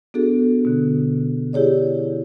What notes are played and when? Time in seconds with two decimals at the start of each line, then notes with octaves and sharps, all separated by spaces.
0.14 B3 D4 F#4 G#4 A4
0.65 B2 D3
1.53 E4 G4 G#4 C#5 D5